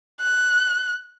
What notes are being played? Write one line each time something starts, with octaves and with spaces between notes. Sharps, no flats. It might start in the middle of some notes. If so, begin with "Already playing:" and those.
F#6